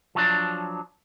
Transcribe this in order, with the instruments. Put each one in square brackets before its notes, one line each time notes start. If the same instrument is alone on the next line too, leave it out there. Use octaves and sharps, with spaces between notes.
[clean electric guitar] F3 F#3 D4